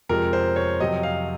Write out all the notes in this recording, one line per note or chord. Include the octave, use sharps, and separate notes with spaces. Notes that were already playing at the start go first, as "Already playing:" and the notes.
F2 C3 F3 G#3 A#4
C5
C#5
F2 C3 F#3 D#5
F5